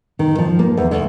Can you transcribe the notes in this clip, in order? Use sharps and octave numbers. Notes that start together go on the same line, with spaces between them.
D#3
F3
A#3
E2
D2